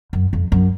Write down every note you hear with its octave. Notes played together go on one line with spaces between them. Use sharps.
F#2
F2
F#2